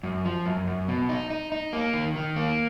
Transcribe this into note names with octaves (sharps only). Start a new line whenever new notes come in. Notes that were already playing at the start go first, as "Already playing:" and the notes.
F#2
F3
F#2
F#2
B2
D#4
D#4
D#4
A#3
D#3
D#3
A#3